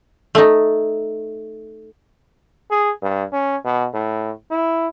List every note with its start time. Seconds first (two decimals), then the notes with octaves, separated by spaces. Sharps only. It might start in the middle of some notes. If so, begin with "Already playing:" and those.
0.35 A3 D#4
2.71 G#4
3.03 G2
3.33 C#4
3.65 B2
3.94 A2
4.51 E4